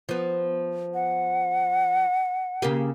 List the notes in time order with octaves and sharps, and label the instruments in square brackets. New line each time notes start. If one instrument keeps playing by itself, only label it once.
[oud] F3 B3
[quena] F#5
[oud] C#3 A#3 G4